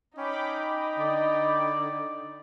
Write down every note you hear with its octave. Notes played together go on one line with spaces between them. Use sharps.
C#4 D#4 G5 B5 D6
D3 D5